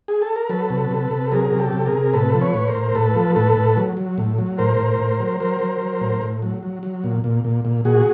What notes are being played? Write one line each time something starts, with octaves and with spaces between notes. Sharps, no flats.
G#4
A4
A#4
F#3 A4 B4
C3
C3
C3
F#3 G#4 A#4
C3
G4 A4
C3
G#4 A#4
C3
A2 A4 B4
F3
B4 C#5
A2
A#4 C5
A2
A2 A4 B4
F3
A2 A4 B4
A2
F#3
F#3
A2
F#3
A2 A#4 C5
A2
A2
F#3
F#3 A#4 C5
F#3
F#3
A2
A2
F#3
F#3
F#3
A#2
A#2
A#2
A#2
A#2 F#4 G#4